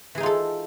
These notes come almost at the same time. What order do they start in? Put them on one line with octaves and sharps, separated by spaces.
E3 G#4 D#4 F4 A4